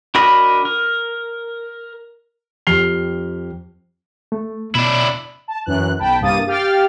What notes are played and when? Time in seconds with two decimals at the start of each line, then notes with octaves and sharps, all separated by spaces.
0.15 D4 F#4 A#4 D#5 B5
0.65 A#4
2.67 F2 G4 F6 C7 F7 G7
4.32 A3
4.75 B2 D4 E4
5.48 A5
5.66 F#2 E3 F#6
5.99 B1 G5 A5 B5
6.20 C2 G2 A#3 D#6 A6 D#7
6.47 G4 F5 G5 F6 A6